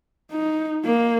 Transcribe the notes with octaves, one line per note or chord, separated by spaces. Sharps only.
D#4
A#3